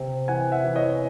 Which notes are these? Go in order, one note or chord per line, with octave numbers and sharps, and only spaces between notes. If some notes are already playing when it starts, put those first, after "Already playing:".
Already playing: C3 C4
E3 F#5 G#5
E5 F#5
E3
C#5 D#5